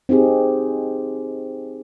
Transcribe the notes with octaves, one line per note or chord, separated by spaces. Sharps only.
C4 D#4 G4 G#4